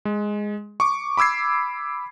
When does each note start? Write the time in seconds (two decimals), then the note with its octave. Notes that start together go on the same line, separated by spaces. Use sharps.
0.05 G#3
0.80 C#6 D6
1.17 B5 D6 E6 G#6 C7